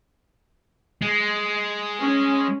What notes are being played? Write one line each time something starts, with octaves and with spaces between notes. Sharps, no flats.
G#3
C#4